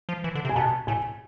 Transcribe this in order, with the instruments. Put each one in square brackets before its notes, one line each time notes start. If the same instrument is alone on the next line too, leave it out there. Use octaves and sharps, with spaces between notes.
[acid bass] F3
E3
D3
C3
[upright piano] G#5
[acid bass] B2 [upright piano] A5
[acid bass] A2 [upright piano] G#5